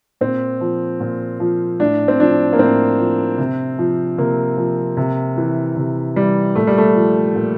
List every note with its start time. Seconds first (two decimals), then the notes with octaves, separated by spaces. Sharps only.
0.21 A#2 C4
0.61 F3
1.00 A#2
1.40 F3
1.80 A2 D4
2.08 C4
2.19 F3 D4
2.53 A#3
2.59 A2 C4
2.99 F3
3.38 C3
3.79 F3
4.18 C3 A#3
4.57 F3
4.97 C3
5.37 E3
5.76 C3
6.16 E3 G3
6.55 A#2 A3
6.67 G3
6.78 A3
6.95 F3
7.35 A#2